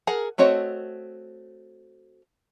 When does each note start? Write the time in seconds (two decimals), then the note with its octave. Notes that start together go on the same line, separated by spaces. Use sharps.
0.07 G#4 A#4 F#5
0.38 A3 C4 F#4 C#5 D#5